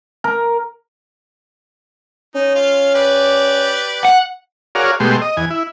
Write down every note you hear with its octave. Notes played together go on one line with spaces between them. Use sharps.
A#4
C#4 D#4
F4 F5
G4 B4 D5
F#5
F#4 G#4 A#4 C#5 D5 F5
B2 G#3 A3 G4 C6
D#5
E2 G#5
E4